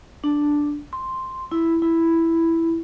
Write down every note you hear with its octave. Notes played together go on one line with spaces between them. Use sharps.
D4
C6
E4
E4